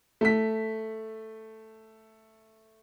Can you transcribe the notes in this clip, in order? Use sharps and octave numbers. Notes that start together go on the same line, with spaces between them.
A3 B6